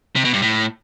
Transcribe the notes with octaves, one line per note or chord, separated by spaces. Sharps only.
C3
B2
G2
A2